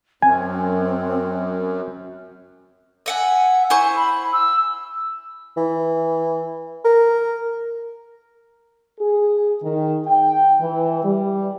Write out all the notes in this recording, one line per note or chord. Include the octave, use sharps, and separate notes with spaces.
F#2 C4 G#5
E5 F#5 G#5
E4 C5 G#5 C#6
B5
E6
E3
A#4
G#4
D#3
G5
E3
G3